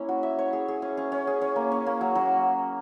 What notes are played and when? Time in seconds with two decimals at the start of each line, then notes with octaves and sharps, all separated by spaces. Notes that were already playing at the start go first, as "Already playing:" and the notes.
Already playing: A#3 C#4 E4 C#5
0.09 F#4
0.23 E5
0.39 C#5
0.53 G#4
0.68 G#4
0.82 C#4
0.97 C#4
1.12 C#4
1.27 G#4
1.41 C#4
1.56 A#3
1.72 C#4
1.86 A#3
2.01 F#3
2.15 F#3